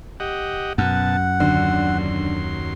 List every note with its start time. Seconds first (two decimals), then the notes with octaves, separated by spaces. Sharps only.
0.20 G4 D#5 F#5
0.78 F#2 B2 F#5 A5
1.40 D#2 D3 F#3 C6